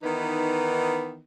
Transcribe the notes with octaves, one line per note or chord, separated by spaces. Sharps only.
D#3 E3 B3 D#4